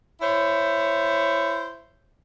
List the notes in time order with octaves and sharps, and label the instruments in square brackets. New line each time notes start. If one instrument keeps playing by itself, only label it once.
[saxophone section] E4 C5 C#5